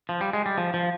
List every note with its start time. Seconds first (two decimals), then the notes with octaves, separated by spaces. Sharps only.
0.09 F3
0.21 G3
0.33 G#3
0.46 G3
0.58 F3
0.74 F3